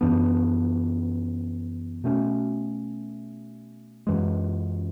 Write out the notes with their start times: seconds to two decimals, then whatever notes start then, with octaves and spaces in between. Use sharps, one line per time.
0.01 F#2 E3 B3 D4
2.04 B2 A3 C#4
4.07 F#2 E3 G#3